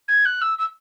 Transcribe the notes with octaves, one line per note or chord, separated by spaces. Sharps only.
G#6
F#6
E6
E6